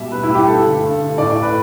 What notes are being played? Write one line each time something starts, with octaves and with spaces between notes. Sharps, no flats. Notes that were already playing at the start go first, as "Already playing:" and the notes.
Already playing: B2 G3 E5
B2 B4
E4
G3
G4
G2 A4
D3 A3
G2
D3 A3
A2 D5
D5
A3
B4